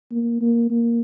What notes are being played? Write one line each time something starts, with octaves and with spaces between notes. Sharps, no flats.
A#3
A#3
A#3